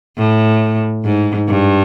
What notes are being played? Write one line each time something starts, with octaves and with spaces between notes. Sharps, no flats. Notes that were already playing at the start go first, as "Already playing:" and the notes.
A2
G#2
G2